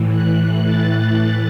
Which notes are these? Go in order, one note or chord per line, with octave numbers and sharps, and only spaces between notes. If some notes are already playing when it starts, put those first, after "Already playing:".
Already playing: A2 E3
F#6
A6